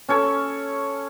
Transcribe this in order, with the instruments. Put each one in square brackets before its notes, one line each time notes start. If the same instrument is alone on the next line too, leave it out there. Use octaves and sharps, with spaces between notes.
[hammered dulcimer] C#4 A4 C#5